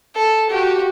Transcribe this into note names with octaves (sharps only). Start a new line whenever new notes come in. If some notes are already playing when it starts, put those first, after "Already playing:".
A4
F#4 G4